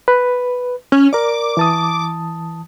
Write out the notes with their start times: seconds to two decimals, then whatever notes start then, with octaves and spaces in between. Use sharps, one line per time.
0.08 B4
0.92 C#4
1.13 A#4 D5 D6
1.57 E3 A5 D#6